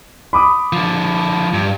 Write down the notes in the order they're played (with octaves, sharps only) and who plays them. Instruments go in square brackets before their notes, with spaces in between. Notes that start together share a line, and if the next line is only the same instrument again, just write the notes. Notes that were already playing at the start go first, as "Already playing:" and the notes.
[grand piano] B5 D6 D#6
[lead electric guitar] D3 F3
G2